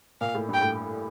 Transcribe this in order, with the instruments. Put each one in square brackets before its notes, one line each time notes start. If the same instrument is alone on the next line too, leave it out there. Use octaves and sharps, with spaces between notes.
[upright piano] A#2 [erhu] F5
[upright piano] A2
[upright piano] G2 [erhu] G5
[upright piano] A2